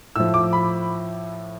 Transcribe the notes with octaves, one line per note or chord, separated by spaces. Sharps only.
A2 F3 E6
D6
B5